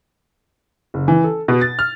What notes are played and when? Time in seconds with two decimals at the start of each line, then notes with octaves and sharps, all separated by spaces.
0.94 F#1
1.08 E3
1.24 A4
1.48 B2
1.61 A6
1.79 F6